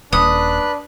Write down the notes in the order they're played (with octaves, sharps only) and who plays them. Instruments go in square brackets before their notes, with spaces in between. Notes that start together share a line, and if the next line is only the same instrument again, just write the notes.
[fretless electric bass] D#1 [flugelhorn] D4 [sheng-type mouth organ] B4 F#6 [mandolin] D#6